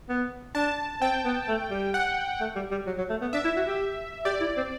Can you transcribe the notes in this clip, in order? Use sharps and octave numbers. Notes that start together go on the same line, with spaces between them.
B3
D4 A5
C4 G5
B3
A3
G3
F#5
A3
G3
G3
F#3
F#3
A3
B3
D4 E5
E4
F#4
G4
G4 D5
E4
C4